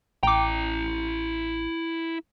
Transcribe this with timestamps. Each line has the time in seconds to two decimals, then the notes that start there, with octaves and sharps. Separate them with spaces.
0.23 A1 E4 G5 A#5 D6